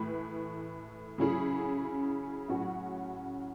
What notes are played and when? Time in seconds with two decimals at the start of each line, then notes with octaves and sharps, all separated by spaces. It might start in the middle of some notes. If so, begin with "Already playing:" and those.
Already playing: A2 E3 A3 E4 B4
1.18 C#3 F#3 C#4 E4 G#4
2.48 A2 F#3 C#4 F#4